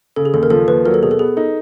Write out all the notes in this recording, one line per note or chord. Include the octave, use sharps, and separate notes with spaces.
C#3 A4
G#4
D#2 A4
A#4
F3 A4
D#2 B4
F#3 A#4
A4
B2 G#4
A4
B3 G#4
D#4 A4